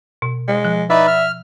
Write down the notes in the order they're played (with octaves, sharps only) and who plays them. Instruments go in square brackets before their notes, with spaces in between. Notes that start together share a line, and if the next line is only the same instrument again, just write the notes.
[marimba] B2
[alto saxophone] G#3
[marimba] F3
[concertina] D#4 B4 D5 [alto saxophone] E5
[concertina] F6